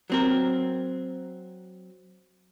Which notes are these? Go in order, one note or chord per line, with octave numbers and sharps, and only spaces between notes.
F#3 C4 A#4